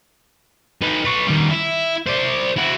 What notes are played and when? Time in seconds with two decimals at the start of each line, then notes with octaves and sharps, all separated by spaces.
0.82 D#4 B4
1.05 B4 C#5
1.27 D#3 G3
1.51 E4
2.07 C5 D5
2.57 E4 F#4